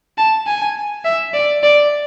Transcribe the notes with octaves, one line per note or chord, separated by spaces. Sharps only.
A5
G#5
E5
D5
D5